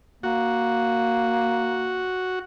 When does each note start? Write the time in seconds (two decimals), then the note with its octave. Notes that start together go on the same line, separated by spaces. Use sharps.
0.23 A#3 F#4